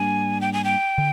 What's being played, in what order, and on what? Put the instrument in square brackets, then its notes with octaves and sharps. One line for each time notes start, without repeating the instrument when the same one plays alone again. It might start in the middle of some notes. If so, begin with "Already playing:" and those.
Already playing: [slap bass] G#2 G3 A#3 D4 [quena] G#5
[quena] G5
G#5
G5
[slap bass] D3